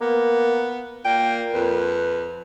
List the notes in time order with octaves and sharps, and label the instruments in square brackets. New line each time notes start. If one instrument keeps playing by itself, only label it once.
[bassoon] A#3 [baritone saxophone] B3
[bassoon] A#2 [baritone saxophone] A#3 [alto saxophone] G5
[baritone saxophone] F2 [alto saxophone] B4